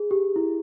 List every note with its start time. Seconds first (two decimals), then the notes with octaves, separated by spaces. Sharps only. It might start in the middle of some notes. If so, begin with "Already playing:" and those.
Already playing: G#4
0.11 G4
0.36 E4